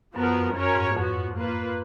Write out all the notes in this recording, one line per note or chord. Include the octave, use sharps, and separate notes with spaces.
F#2 F3 B3 F#4 A#4
F2
F#2 C#4 F#4 A#4 C#5
G#2
F2 F3 B3 F#4
A#3 F4 B4